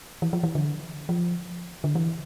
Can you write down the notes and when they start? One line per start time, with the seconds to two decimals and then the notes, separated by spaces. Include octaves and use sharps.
0.22 E3
0.33 F3
0.43 E3
0.55 D3
1.09 F3
1.84 D3
1.95 E3